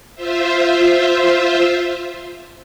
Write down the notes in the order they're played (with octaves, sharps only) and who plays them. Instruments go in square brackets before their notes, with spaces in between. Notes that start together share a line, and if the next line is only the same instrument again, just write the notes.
[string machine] F4 C5 E5